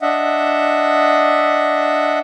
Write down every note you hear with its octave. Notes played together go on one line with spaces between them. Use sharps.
D4 D#5 E5 F#5